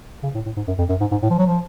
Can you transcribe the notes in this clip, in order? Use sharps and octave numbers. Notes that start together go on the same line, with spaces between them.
C#3
A2
A2
G#2
F#2
F2
F#2
G#2
G#2
A2
F3
F#3
F3